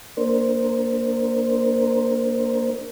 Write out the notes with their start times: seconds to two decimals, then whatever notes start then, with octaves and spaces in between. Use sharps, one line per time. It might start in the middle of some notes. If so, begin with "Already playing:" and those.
0.17 A#3 D4 A#4 C5